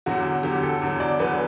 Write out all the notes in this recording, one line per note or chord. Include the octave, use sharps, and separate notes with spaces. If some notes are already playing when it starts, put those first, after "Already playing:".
E2 D3 F#3 F#4
E2 D3 F#3 G4
A4
E2 D3 F#3
D5
E2 D3 F#3 B4